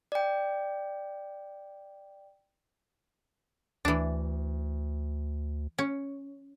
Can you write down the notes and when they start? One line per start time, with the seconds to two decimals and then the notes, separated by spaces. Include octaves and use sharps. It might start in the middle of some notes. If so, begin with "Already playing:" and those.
0.12 D5 G5
3.85 D2 E3 D4
5.78 C#4